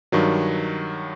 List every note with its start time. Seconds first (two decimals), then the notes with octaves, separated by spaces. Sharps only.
0.12 G2 D#3 F#3